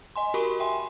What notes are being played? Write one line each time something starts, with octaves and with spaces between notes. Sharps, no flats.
D#5 G#5 C6
F#4 G4 A#4 B5 C#6
E5 G5 G#5 C6